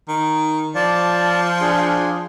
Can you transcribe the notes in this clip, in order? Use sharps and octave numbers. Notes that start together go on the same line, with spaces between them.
D#3
F3 D5 A5
D4 G#4